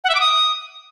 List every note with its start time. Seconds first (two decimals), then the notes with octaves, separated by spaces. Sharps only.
0.04 F#5
0.09 E5
0.14 D6
0.20 D#6